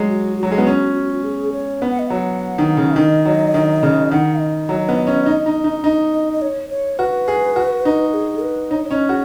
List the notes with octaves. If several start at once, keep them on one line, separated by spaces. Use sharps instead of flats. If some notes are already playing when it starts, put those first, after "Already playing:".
Already playing: F#3 G#3
F#4
F#4
F#3
G#3
B3
C#4
G#4
C#5
B3
F#5
D#5
F#3 F#5
D#3
C#3
D#3 D#5
F#3
D#3
C#3
D#3 F#5
D#5
F#3
B3
C#4
D#4
D#4
D#4
D#4
D#5
D#5
C#5
C#5
F#4 B4
G#4
F#4
D#4
G#4
B4
D#4 C#5
C#5
C#4 D#5
F#4 G#4